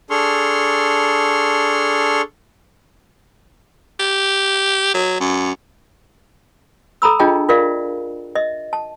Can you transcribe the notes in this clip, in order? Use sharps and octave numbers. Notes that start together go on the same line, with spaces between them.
D4 G#4 A4 C6 C#6 F6
G4
F#3
F#2
A4 A#5 B5 E6
D4 F4 G#4 D#5 G5 A5
F4 A#4 D5 E5 F5
D#5 E5
A5